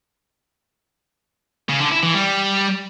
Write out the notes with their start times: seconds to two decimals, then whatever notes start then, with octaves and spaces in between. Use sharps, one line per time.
1.69 C#3
1.80 D3
1.92 E4
2.03 E3
2.14 G3